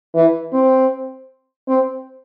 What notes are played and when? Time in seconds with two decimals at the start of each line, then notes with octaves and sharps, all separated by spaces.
0.15 E3
0.53 C4
1.68 C4